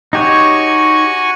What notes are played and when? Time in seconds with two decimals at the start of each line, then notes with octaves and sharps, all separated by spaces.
0.13 D#4 F#4 G4 C#5 G#5 C#6